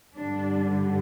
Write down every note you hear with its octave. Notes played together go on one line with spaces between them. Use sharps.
G2 D3 G3 D4